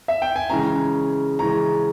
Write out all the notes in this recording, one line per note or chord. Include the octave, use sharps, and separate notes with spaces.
E5
G5
G#5
C#3 E3 G#3 C#4 A#5
C#3 E3 G#3 C#4 A#5